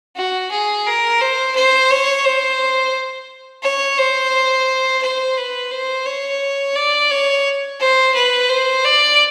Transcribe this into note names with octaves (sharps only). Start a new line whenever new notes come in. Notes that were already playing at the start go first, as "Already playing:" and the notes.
F#4
G#4
A#4
C5
C5
C#5
C5
C#5
C5
C5
B4
C5
C#5
D5
C#5
C5
B4
C5
D5